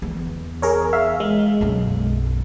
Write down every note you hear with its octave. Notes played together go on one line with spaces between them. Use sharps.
E2
G#4 A#4 C#5
E5 F5
G#3
B1 F#2